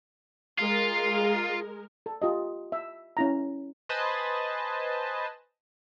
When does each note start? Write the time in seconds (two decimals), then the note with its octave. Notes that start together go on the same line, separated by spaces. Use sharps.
0.59 G#3 F4 A#4
2.06 A4
2.22 F4 G4 D#5
2.72 E5
3.17 C#4 E4 A#5
3.89 B4 C5 D#5 G#5 A5